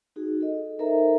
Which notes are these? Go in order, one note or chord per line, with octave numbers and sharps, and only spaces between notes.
D#4 F#4 G#4
A4 D#5
D#4 A4 A#4 C5 E5 A#5